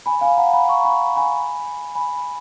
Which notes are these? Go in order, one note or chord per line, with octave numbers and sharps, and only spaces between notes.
G#5 B5
F5 G#5
F#5 A#5
G#5 B5
A#5 C#6
G#5 B5
G#5 B5
G#5 B5